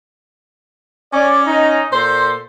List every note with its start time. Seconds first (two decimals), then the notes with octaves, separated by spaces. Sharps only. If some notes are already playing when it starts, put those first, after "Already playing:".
1.13 C#4 C#5 D5
1.46 D#4
1.92 A#2 A4 C5 C6